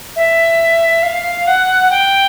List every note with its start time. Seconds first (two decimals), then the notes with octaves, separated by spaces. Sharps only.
0.16 E5
1.02 F5
1.47 F#5
1.90 G5